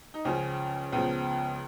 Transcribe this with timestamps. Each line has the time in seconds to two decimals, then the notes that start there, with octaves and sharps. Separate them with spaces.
0.14 D#4
0.25 C#2 C#3 F3 C#4
0.92 C#2 C#3 F3 B3